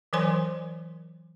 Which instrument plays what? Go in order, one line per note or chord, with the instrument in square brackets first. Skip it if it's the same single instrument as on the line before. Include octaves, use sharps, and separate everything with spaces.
[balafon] E3 F#3 A#4 C5 G#5 C6